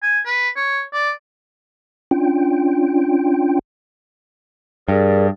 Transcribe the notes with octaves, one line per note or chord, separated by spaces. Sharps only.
G#5
B4
C#5
D5
C#4 D4 F4 G5
G2 G#4 A#4 D5